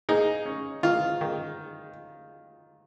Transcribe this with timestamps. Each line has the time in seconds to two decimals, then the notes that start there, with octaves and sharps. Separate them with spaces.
0.09 A#3 D#4 G#4
0.46 C#4
0.83 D#3 F4
1.21 D#3